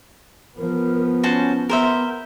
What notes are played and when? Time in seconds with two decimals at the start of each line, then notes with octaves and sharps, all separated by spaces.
0.58 F3 B3 A#4
1.23 C#4 F#4 C5 A5
1.69 B3 A#4 C5 E5